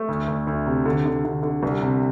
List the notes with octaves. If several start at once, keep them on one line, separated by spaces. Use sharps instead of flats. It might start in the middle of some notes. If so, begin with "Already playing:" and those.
Already playing: A3
D2
D2
D2
C3
D3
D3
D3
D3
C2
C3